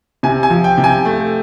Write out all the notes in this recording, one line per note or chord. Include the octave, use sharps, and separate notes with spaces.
C3 G#5
G#5
F3
G5
C3
G#5
A3